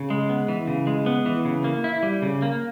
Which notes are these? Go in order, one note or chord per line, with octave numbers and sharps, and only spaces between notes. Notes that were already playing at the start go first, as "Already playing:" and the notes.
Already playing: C#3
G#3
B3
E3
C#3
G#3
B3
E3
C#3
A#3
E4
G3
C#3
A#3